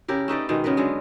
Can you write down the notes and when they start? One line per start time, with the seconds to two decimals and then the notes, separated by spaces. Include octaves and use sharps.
0.08 C#3 E4 G4 A#4
0.28 A3 D#4 B4 D5
0.49 B2 D#3 G#3 D#4
0.64 C#3 B3 A#4 B4
0.77 D3 F#3 G#3